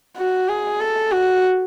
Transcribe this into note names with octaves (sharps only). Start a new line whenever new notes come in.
F#4
G#4
A4
F#4